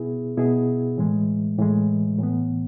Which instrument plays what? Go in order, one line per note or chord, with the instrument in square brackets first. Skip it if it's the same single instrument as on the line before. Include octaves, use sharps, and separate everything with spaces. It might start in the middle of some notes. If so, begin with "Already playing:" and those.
Already playing: [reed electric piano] B2 B3 E4 G#4
B2 B3 E4 G#4
A2 E3 G#3
A2 E3 G#3
A2 E3 B3